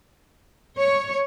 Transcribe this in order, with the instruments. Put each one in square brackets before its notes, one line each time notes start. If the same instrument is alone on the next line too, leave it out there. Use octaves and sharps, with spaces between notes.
[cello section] C#5